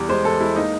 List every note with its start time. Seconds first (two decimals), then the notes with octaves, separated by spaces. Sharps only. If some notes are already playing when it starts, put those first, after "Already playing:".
Already playing: E2 G3
0.09 G#3 C5
0.25 E2 A4
0.41 G#3 E4
0.56 A#3 D#4